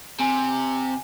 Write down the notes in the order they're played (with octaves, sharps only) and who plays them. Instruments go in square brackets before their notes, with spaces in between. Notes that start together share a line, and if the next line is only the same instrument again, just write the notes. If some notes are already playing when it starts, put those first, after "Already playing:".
[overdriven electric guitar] C3 [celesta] G#5